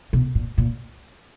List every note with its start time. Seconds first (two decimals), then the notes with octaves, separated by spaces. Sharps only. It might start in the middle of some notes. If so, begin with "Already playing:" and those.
0.13 B2
0.35 A#2
0.58 A#2